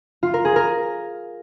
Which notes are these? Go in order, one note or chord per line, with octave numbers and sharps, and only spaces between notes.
F4
A#4
G#4
A#4